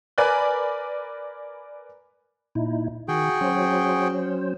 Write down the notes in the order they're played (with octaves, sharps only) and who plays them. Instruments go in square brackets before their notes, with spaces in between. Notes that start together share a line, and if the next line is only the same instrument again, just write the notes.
[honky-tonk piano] A#4 B4 D5 G#5 B5 F#6
[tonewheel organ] A#2 D#4 E4
[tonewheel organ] D#3 [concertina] F#4 G#4 G5
[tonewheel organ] F#3 C#4 C5